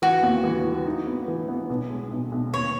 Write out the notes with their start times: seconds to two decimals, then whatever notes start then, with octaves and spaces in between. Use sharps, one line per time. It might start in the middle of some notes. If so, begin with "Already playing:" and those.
0.02 E3 F#4
0.23 D#2
0.44 E3
0.64 E3
0.86 D#4
1.07 B3
1.28 E3
1.48 B3
1.70 B1
1.90 G#3
2.12 B1
2.32 B1
2.53 D#2 C#5